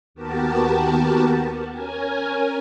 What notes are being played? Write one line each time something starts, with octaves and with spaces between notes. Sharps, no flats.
D#2 B3 F#4 G4 A#4 A5
C#4 A#4 G#5